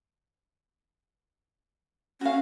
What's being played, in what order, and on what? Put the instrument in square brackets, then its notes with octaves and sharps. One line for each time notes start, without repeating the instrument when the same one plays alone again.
[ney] C#4 [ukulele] F#4 F5